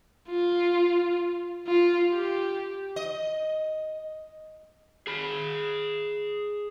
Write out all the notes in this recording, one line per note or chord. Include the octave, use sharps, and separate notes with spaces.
F4
F4
G4
D#5
G#4 B5